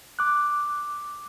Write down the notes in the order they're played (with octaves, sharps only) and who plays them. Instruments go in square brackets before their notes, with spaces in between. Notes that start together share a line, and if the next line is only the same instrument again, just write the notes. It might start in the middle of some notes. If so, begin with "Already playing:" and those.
[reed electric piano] D6 F#6